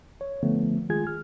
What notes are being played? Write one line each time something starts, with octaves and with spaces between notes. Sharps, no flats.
C#5
D3 F3 A3 B3
D#3 G#3 F4 G#4 G#5 G#6
F6